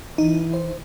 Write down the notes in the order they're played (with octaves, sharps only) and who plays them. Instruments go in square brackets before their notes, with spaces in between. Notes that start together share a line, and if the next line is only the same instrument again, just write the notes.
[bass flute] E3 [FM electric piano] D#4
[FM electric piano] C5